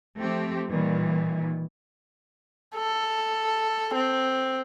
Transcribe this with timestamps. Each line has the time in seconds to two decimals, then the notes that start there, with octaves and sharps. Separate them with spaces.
0.19 F3 A3 C4 G4
0.67 A#2 D#3 E3 G3
2.76 A4
3.95 C4